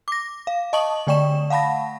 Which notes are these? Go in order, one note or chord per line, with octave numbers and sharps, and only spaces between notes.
D6 A#6
F5
D#5 A5 C#6 D#6 F#7
D3 A3 D5 G5 C#6 E7
F5 F#5 A5 B5 A#6